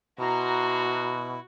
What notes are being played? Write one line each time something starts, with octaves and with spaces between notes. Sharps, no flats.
B2 E4 F#4 A#5 C6